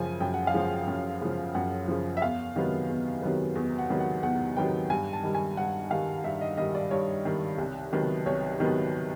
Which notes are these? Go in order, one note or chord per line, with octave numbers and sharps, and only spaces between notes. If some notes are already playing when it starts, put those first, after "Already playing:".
Already playing: F#2 C#3 F3 G#5
F#2 G5
F#5
F5
C#3 F3
F#5
F#2
C#3 F3
F#2 F#5
C#3 F3
E5
E2 F5
C3 D#3 F#3 B3
E2
C3 D#3 F#3 B3
E2
F#5
C3 D#3 F#3 B3
F#5
E2 F#5
C3 D#3 F#3 B3 G5
G2 G#5
A5
D#3 G3
G#5
G2 F#5
D#3 G3 F5
G2 E5
D#5
D#3 G3 D#5
D5
G2 C#5
D#3 G3
C2
C3 D#3 F#3 B3
C2 C#5
C3 D#3 F#3 B3